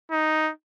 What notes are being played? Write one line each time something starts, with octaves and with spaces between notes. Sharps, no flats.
D#4